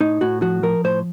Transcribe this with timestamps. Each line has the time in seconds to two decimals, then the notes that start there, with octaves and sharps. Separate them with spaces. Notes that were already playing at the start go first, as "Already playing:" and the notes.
0.01 A2 D#4
0.21 A2 F#4
0.42 F3 F#4
0.63 F3 A#4
0.84 A2 C5